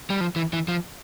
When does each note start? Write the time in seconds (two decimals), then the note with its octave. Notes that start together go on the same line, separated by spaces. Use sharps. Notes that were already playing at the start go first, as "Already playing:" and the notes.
0.10 G3
0.21 F3
0.36 E3
0.53 E3
0.68 F3